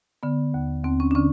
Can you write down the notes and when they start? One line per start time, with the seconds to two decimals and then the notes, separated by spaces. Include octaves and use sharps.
0.23 D3 B3
0.54 D#2
0.84 D#2 C4
1.00 C#4
1.11 D4
1.15 D3 C#4